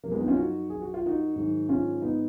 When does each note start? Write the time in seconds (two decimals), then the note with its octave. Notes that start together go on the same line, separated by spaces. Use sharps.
0.04 F3 A#3
0.08 F#2 G#3 B3
0.21 B3 D#4
0.28 C#4 F4
0.36 D#4 F#4
0.70 G#4
0.81 F#4
0.94 F4
1.06 D#4 F#4
1.36 G#2 D#3 F#3
1.69 C#4 F4
2.01 B3 D#4